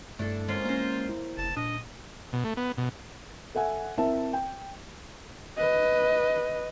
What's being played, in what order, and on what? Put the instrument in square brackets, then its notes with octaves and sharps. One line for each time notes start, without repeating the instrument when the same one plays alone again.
[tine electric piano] G2 [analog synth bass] A3 [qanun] D4 E4 A4
[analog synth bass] G#3 [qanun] A#3 C4 C#4 [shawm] F4
[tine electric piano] A#3 C#4 [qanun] C5 A#5
[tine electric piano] E4
[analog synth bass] F#1 [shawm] A5
[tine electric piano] A#2 [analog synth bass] D4 [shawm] D#5
[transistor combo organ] B2
A3
B3
B2
[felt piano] A4 E5 F#5 G#5
C4 E4 A#4 E5 A5
G5
[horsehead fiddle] B4 D#5